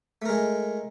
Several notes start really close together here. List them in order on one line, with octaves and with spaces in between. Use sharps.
A3 A#4 G#3